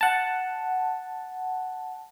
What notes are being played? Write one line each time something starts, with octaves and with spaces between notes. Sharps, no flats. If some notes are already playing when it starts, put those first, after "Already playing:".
F#5 A5